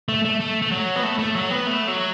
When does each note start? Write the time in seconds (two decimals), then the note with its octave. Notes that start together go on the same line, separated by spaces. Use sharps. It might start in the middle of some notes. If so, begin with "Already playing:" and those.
0.09 A3
0.25 A3
0.40 A3
0.62 A3
0.71 F#3
0.96 B3
1.03 A3
1.19 A3
1.36 F#3
1.51 B3
1.67 A3
1.88 F#3